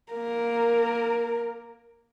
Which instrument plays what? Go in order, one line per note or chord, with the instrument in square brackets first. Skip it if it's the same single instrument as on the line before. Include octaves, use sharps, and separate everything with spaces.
[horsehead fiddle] A#3 A#4